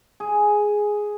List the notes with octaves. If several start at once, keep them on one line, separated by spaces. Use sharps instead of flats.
G#4